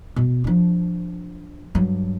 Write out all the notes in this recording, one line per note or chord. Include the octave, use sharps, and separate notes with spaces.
B2
F3 D4
G2 F#3